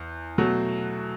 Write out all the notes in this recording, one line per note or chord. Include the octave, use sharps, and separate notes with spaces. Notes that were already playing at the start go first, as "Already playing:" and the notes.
Already playing: E2
B2 F#3 A3 F#4